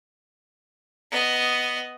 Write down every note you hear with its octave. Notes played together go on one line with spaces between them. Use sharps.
B3 D#5